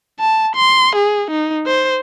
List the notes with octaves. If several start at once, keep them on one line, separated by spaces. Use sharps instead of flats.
A5
C6
G#4
D#4
C5